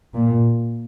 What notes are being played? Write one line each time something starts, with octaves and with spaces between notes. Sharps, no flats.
A#2